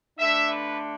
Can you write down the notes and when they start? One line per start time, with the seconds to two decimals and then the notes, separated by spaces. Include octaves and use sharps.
0.18 D3 A3 D4 E5
0.49 B4